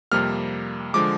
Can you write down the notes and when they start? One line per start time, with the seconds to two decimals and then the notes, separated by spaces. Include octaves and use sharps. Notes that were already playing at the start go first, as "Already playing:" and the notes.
0.12 F2 C3 G3 A#3 F6
0.94 D3 F3 G#3 D6